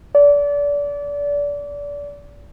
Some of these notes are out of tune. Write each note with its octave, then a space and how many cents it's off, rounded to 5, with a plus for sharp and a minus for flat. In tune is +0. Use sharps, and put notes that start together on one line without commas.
D5 -30